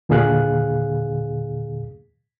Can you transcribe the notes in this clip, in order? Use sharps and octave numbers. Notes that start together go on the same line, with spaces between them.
D#2 A#2 D3 G#4 F5 F#6